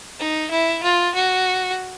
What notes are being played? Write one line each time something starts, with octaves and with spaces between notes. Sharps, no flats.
D#4
E4
F4
F#4